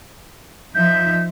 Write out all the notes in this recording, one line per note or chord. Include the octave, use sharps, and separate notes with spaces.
F3 D#4 E5 G6